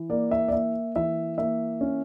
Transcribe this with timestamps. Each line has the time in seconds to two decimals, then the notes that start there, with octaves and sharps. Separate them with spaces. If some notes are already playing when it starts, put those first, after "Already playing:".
Already playing: E3
0.10 A#3 D5
0.31 E5
0.48 D5
0.53 A#3 E5
0.96 E3 E5
1.38 A#3 E5
1.81 C#4